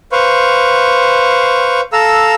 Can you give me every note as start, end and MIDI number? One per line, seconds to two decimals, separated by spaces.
0.12 1.81 71
0.12 1.81 72
0.12 1.81 77
0.12 1.81 85
1.93 2.35 69
1.93 2.35 77
1.93 2.35 82
1.93 2.35 88